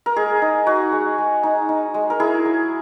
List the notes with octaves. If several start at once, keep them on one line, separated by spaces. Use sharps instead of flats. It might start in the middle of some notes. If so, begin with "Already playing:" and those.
A#4
G#3 G#4
D#4
D#4 F#4
G#3
G#3
D#4
D#4
G#3
A#4
E4 G#4
F#3